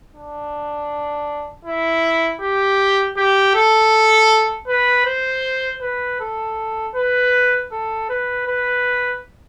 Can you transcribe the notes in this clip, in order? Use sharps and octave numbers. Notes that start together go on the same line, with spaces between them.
D4
E4
G4
G4
A4
B4
C5
B4
A4
B4
A4
B4
B4